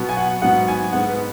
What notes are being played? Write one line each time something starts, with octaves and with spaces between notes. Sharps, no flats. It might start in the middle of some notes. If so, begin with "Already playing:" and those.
Already playing: B2 F#3 B3
G#5
F#5
G#2 F#3 B3 F#5
G#5
G#2 G#3 B3 F#5
B4